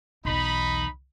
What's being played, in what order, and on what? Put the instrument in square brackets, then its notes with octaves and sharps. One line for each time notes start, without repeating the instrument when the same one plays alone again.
[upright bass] B1 E2 [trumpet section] D#4 B5